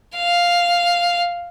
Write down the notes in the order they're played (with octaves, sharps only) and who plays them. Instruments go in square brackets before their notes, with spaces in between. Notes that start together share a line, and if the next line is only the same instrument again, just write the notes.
[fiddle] F5